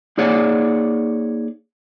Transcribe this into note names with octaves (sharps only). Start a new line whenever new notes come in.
A#3 D#4 G#4 C#5 D5 F#5